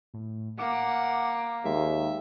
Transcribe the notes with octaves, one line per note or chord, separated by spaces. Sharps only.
A2
A#3 F#5 D6
D#2 G#3 E5